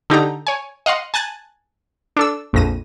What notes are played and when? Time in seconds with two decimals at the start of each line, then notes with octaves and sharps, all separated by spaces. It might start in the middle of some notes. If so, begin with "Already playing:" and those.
0.10 D3 D#4 G4 A#5
0.47 C#5 G#5
0.86 D#5 F5 F#5 C6
1.14 G#5 A5 F#6 G#6 A6
2.17 D4 A4 E6
2.53 A#1 F2 A#6 D#7